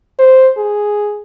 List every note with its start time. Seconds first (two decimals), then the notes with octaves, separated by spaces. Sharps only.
0.19 C5
0.57 G#4